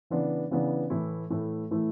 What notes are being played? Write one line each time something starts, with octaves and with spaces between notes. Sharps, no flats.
C#3 E3 B3 D4
C#3 E3 B3 D4
A2 E3 A3 E4
A2 E3 A3 E4
A2 E3 A3 E4